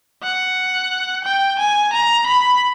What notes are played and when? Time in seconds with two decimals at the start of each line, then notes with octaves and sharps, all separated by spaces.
0.23 F#5
1.24 G5
1.59 G#5
1.93 A#5
2.27 B5